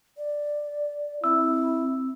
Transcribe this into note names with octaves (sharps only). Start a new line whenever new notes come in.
D5
C4 E4 E6